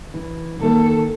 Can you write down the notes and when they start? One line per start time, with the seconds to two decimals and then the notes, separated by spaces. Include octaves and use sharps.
0.14 E3
0.60 D#3 A#3 A4